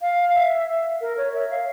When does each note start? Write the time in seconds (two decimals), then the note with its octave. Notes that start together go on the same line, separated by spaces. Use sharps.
0.01 F5
0.34 E5
1.00 A#4
1.17 C#5
1.33 E5
1.50 F5